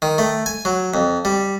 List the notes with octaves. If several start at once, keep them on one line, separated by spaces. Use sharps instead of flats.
D#3
A3
G#5
F#3
F2
G3